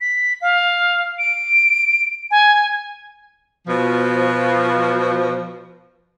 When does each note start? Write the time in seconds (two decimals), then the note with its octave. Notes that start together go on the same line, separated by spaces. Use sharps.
0.01 B6
0.42 F5
1.19 D7
2.31 G#5
3.67 B2 F3